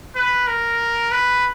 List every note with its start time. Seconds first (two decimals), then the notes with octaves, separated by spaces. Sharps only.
0.16 B4
0.47 A#4
1.11 B4